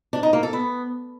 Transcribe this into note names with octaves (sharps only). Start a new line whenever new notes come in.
D4
D#4
A#3
A4
B3